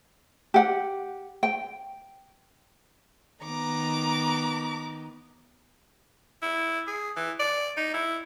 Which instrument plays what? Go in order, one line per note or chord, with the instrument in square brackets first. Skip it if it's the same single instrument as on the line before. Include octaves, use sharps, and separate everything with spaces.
[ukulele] G4 F#5
G5
[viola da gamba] D#3 B3 [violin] A#5 D6
[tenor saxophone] E4
G#4
E3
D5
D#4
E4